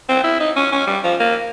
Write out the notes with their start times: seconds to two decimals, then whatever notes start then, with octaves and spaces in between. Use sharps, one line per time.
0.09 C4
0.24 E4
0.40 D#4
0.57 C#4
0.72 C#4
0.87 G3
1.04 F3
1.20 A#3